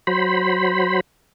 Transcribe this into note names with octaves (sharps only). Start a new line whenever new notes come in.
F#3 C5 B5